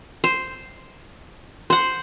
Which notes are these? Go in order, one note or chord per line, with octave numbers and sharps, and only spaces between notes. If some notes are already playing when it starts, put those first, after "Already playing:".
C5
C5 F#5